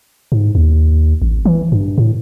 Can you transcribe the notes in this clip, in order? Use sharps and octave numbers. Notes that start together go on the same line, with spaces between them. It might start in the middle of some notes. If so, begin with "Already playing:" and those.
G#2
D#2
A1
E3
G2
A2